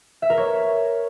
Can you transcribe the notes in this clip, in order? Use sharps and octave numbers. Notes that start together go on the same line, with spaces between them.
E5
A#4
C#5